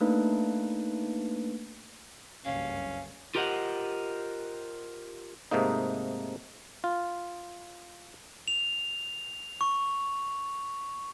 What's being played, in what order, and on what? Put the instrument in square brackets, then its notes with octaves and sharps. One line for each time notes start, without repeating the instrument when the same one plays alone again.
[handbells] A3 A#3 D4 D#4 B4
[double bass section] F#1 C2 G2 [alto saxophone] C#4 [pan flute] F5
[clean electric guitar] F4 G4 A#4 C5 D#5 F#5
[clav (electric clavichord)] G#2 C3 A3 A#3 D#4
F4
[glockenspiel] F7
C#6